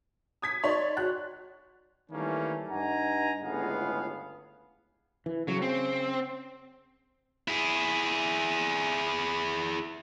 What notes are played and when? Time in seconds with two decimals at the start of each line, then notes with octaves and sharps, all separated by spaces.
0.42 D#6 G#6 B6
0.63 D#4 C#5 D5 C6
0.97 F#4 F#6
2.10 D#3 E3 G3 A3 A#3 C#4
2.68 G2 D#4 F#5 G#5 A#5
3.42 G1 C#2 A2 B3 G#4 F5
5.26 E3
5.48 C#3 F#3
5.62 C4
7.48 E4 G#4